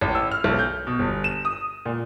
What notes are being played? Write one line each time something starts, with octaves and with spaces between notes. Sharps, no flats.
A1
E6
F6
B1
G6
B2
G1
E7
D#6
A#2